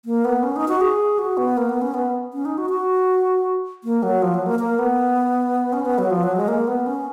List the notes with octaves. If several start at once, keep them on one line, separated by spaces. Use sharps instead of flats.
A#3
B3
C#4
D#4
F#4
G#4
F#4
B3
A#3
B3
C#4
B3
C#4
D#4
F#4
F#4
A#3
F#3
F3
F#3
A#3
A#3
B3
C#4
B3
F#3
F3
F#3
G#3
A#3
B3
C#4